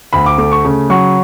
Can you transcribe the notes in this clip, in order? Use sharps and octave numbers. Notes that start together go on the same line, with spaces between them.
D2 B5
D6
A3 D6
C#6
C#3
F#3 C#6